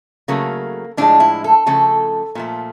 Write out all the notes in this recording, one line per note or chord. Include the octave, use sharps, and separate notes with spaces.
C#3 F#3 A3 A#3
A2 F3 G#3 D4
E4
A4
C#3 F3 A3 A4
A#2 F3 A3